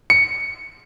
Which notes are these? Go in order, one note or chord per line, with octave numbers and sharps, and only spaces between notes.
C#7